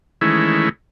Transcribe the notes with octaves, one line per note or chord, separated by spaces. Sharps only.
D#3 E3 G#3 A3 C#4 E4